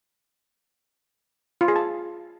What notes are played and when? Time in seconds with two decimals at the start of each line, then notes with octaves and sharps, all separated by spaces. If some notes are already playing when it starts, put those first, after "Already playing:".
1.61 F4
1.68 G#4
1.76 A5